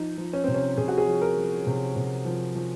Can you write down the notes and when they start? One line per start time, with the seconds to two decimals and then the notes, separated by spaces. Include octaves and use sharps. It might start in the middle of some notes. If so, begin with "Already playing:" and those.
Already playing: F3 D#4
0.18 F3
0.33 C#4
0.44 C3 C4
0.54 C#4
0.77 C3 G#4
0.88 F#4
0.98 G#4
1.07 F3
1.22 A#4
1.37 F3
1.67 C3
1.96 C3
2.25 F3
2.55 F3